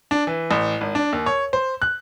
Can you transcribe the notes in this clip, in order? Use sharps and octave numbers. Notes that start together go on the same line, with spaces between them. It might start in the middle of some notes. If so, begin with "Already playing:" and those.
D4
E3
A1
G#1
D4
D#2
C#5
C5
F#6